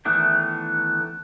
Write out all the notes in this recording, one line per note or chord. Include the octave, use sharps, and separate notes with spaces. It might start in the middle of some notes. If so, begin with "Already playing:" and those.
D#3 E3 A3 B3 D4